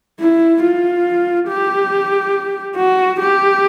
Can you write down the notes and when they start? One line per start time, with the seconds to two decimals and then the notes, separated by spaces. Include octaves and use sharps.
0.20 E4
0.63 F4
1.48 G4
2.76 F#4
3.20 G4